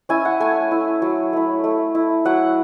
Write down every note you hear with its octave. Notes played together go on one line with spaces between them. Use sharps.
C#4 E4 G#5
F#5
A3 G#5
E4
F#3
A3 E4
A3
E4
F#3 F#5